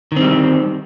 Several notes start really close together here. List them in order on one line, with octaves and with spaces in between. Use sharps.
D#3 C4 G3